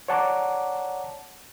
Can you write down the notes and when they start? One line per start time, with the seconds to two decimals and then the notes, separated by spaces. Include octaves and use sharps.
0.08 C#5 D5 F#5 A5 A#5 D6